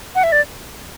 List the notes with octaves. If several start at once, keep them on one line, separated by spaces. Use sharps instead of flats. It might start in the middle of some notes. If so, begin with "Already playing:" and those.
F#5
E5
D5